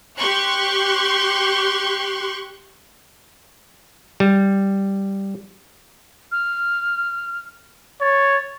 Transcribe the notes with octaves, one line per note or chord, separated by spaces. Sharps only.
G4 C6 C#6 F#6
G3
F6
C#5 A6